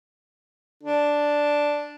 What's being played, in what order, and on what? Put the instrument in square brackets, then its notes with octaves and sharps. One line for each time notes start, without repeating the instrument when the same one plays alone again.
[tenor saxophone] D4